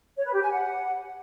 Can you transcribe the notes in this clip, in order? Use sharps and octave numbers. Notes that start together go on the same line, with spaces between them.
C#5
B4
G4
G#5
F#5